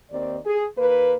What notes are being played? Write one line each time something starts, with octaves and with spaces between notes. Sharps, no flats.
D#2 D#3 C4 D5
G#4
D#2 A#3 B4